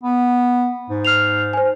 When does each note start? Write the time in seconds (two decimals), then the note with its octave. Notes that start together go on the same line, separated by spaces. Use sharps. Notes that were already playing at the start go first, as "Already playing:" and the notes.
0.03 B3
0.90 G#2
1.05 F6 C7 F7
1.53 C5 G#5